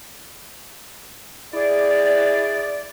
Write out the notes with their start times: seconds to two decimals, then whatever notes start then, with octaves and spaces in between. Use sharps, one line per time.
1.53 E4 G#4 D5